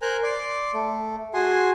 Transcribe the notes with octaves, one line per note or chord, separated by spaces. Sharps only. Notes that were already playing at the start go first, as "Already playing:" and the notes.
A#4 C5 G#5 A#5 F#6
D5 C6 D6
A3
F#4 G#4 G#5 C6